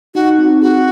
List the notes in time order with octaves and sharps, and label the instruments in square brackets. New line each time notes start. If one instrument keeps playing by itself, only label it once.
[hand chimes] D#4 [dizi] F#4
[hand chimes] C4
[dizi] F#4 [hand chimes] G#4